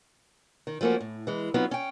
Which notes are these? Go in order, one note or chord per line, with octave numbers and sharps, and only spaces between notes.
D#3
F3 A3 A#3 C#4 F#4
A2
E3 G#3
F#3 B3 C4 D#4 F4
C#4 G5